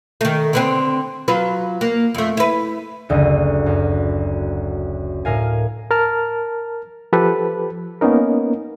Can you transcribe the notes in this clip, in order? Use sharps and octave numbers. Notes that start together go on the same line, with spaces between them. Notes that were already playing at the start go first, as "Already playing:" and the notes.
D#3 A3
D3 B3 C4
F#3 F4 B4
A#3
F2 A3
E4 B4
F#1 D2 D#7
F#2
A2 A#4 F5 G#5
A#4 A5 F6
F3 G4 A4 B4
A#3 B3 C#4 D#4 A#4